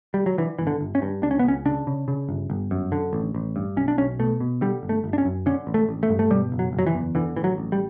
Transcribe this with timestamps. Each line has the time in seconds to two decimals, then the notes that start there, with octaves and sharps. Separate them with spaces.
0.14 G3
0.26 F#3
0.38 D3 E3
0.59 G1 E3
0.67 D3
0.81 G1
0.95 C#4
1.02 G2
1.23 C#2 D4
1.31 C#4
1.39 B3
1.44 C#2 C#4
1.66 C#3 D4
1.87 C#3
2.08 C#3
2.29 G1
2.50 G1
2.71 F#2
2.92 D3
3.13 A1
3.35 A1
3.56 G2
3.77 B1 C#4
3.88 D4
3.98 B1 C#4
4.19 B2 A3
4.40 B2
4.61 D3 G3
4.83 G1
4.89 A3
5.04 G1
5.13 D4
5.18 C#4
5.25 F#2
5.46 D3 C#4
5.67 A1
5.74 A3
5.89 A1
6.03 A3
6.09 G2
6.19 A3
6.30 B2 G3
6.52 F#1
6.59 F#3
6.73 F#1
6.79 F#3
6.87 E3
6.94 E2
7.15 D3 E3
7.36 A1 E3
7.44 F#3
7.58 A1
7.72 G3